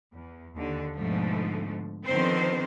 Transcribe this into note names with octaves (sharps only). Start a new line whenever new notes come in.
E2
D#2 D3
G#2 B2 D3 F3 A3
D3 D#3 F3 B3 C4 C5